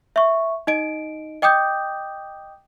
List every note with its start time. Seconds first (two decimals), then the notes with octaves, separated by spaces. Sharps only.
0.16 E5 C#6
0.67 D#4 D#5 D7
1.42 D#5 G5 D6 D#6 G6